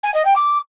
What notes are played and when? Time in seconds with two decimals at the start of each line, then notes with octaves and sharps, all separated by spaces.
0.03 G#5
0.14 D#5
0.25 G5
0.36 D6